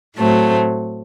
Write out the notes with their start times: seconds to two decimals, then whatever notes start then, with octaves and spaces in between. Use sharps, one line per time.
0.17 A2 F#3 A3 C4